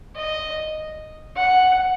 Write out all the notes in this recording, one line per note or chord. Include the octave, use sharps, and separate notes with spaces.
D#5
F#5